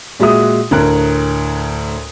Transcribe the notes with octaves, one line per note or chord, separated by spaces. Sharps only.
A#2 G#3 F#4 E5 D#6
D2 A2 A#4 F#6